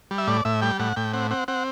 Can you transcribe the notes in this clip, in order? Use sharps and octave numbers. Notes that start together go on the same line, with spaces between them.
G3
E5
A2 D5
A2 E5
G3 G5
A2 F#5
A2 G5
C4 F#5
C4 F#5
C4 F#5